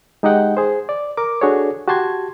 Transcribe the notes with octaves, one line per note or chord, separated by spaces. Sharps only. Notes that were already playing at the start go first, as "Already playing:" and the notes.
G#3 D#4 G4 D#5 F#5 G5
G#4 C5
D5
A#4 D6
D4 F#4 G#4 A4 C#5
F#4 G4 A5 C6 G#6